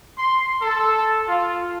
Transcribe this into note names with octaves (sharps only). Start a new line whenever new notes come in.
C6
A4
F4